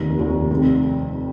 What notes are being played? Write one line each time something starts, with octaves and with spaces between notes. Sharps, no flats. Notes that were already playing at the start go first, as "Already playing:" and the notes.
Already playing: F1 D#2 D#3
F1 D#2 D#3
F1 F2 D#3